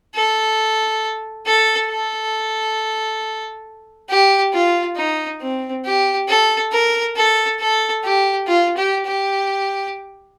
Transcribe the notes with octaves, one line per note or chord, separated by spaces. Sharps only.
A4
A4
A4
G4
F4
D#4
C4
G4
A4
A#4
A4
A4
G4
F4
G4
G4